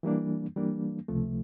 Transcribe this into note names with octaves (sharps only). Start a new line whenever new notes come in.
E3 G3 A#3 D4
E3 G3 A#3 D4
C#2 C3 F3 A3